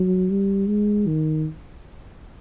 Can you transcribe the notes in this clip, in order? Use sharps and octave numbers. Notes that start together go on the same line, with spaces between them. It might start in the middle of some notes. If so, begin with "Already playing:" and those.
Already playing: F#3
G3
G#3
D#3